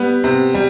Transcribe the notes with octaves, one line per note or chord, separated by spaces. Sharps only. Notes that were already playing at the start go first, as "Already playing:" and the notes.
Already playing: G3 B3
C3
G3